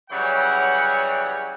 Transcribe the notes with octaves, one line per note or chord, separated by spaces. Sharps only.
C#3 E3 F#3 G3 C#5 F#5